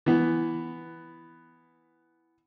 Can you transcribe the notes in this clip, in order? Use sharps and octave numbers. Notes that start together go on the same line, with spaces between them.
E3 B3